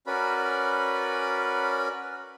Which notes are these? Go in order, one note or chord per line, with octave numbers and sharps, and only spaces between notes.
C#4 F#4 A#4 B4 D5 B5